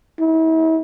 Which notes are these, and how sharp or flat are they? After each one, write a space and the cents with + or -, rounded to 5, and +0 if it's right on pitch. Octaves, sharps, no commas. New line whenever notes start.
E4 -40